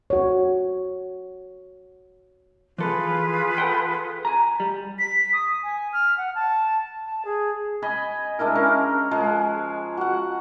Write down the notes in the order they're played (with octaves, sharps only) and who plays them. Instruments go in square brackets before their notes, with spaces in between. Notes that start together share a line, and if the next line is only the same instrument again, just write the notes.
[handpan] F#4 C#5
[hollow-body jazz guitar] E3 A4 [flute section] F4 G#4 B4
[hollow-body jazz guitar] A4 F#5 G5
G#5 A#5
G3
[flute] B6
D#6
G#5
F6
F#5
A5
A5
G#4
[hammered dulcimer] D#5 G#5 B5
G#3 D4 E4 A#4
C#4 A#4 F5
F3 G#3
F#4 F#5